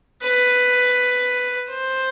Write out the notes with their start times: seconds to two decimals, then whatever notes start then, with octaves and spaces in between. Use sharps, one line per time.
0.23 B4
1.70 C5